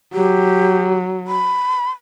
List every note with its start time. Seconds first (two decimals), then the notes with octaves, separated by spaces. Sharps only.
0.14 F#3 G4
1.27 B5